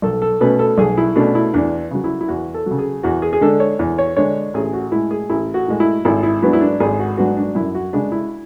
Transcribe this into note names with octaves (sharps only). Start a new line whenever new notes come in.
B1 A4
A4
B2 A3 C#4 B4
A4
B1 G#4
E4
B2 A3 C#4 D4
E4
E2 D4
C#3 F#3
E4
E4
E2 F#4
A4
C#3 F#3
G#4
E2 F#4
G#4
G#4
D3 G#3 D4 A4
C#5
E2
C#5
D3 G#3 D4 C#5
A1 G#4
F#4
A2 G#3 E4
G#4
A1 E4
F#4
A2 G#3
E4
G#1 E4
E4
G#2 F#3 B3 D4 E4
E4
D4
G#1 G#4
F#4
G#2 F#3 B3 D4 F#4
D4
F#2 E4
F#4
C#3 G#3 D4
E4